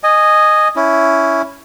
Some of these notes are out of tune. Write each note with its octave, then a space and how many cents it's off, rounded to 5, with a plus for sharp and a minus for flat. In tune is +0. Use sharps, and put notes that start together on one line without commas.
D#5 -10 G#5 +0
C#4 +10 E4 +0